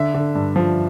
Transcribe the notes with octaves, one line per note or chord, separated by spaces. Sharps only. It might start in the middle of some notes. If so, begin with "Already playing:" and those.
Already playing: D3 E5
D3
G2
F3